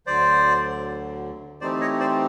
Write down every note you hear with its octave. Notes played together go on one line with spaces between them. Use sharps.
D2 D3 F#3 C5 D5
E3 A3 C4 D#4 G4 C5 D5
C#5 D#5
C5 D5